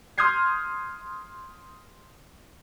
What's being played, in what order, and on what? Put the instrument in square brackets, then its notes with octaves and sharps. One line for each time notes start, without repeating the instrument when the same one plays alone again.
[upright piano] C6 D#6 F6 G6 G#6 C7